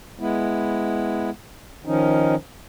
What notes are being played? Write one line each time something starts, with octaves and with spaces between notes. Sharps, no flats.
G#3 B3 E4
D#3 F3 C#4 D#4